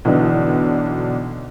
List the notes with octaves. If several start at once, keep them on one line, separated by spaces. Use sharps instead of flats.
B1 D3 E3 F#3 D#4